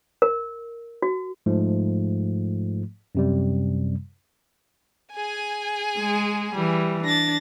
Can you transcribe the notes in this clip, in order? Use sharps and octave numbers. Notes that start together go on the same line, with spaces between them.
A#4
F#4
G#2 F3 A3
F#2 C3 G3
G#4 G#5
G#3
E3 G3
D4 A6 A#6